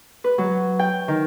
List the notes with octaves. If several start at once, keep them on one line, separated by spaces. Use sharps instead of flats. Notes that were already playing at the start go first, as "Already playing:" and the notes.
B4
F#3
G5
D#3